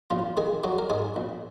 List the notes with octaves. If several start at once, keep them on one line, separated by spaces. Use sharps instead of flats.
A#1 F3 F4
D#3 G#3 G#4
F#3 G#3 F#4
A#4
G#2 G#3 G#4
A#1